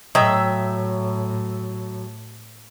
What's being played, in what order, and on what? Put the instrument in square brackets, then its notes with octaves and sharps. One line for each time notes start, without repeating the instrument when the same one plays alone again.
[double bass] A2 [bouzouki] F#3 E5 [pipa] D#5 G5